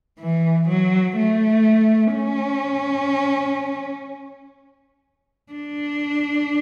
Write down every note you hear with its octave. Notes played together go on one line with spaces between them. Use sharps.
E3
F#3
A3
C#4
D4